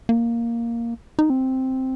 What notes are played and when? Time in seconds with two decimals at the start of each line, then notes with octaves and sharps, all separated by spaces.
0.09 A#3
1.19 D#4
1.30 C4